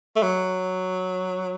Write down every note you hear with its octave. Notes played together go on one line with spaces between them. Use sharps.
A3
F#3